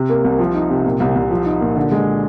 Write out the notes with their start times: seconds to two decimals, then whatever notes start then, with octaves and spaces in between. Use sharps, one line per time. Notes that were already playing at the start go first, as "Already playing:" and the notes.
Already playing: C3
0.09 A#3
0.25 C2
0.39 F3
0.55 D#4
0.70 C3
0.85 A#2
1.00 C2
1.16 C2
1.31 F3
1.46 D#4
1.61 A#2
1.76 D3
1.92 G#3